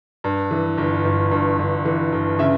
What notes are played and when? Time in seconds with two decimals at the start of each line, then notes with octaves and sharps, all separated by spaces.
0.24 G2
0.51 E3
0.78 G1
1.04 G1
1.31 G2
1.59 G1
1.85 E3
2.12 G1
2.39 C#3 E5